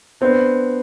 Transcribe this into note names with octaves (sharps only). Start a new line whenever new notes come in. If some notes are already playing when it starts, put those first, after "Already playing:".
B3 C4 D4